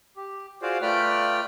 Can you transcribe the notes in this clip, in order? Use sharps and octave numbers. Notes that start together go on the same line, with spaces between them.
G4
F4 F#4 G#4 C5 D5 F5
A3 F4 B4 D5 G5 F6